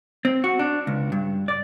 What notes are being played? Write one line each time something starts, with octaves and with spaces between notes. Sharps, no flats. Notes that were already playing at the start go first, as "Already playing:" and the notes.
C4
F#4
D4
C#2
G2
D5